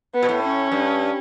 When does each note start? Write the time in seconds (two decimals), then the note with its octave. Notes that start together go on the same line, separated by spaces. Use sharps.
0.14 B3
0.23 B2
0.29 A2
0.43 C#4
0.72 G2